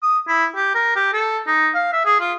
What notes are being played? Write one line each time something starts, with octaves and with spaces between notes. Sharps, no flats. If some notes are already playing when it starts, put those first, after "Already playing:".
D#6
E4
G4
A#4
G4
A4
D#4
F5
E5
G#4
F4